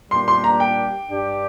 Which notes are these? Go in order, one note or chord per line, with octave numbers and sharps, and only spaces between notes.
A#2 G3 A#3 D4 G4 C6
C6
A#5
G5
G2 G3 D4 G4